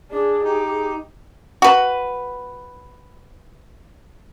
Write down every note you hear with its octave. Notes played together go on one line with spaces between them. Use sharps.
D4 G#4
D#4 G4
F#4 B4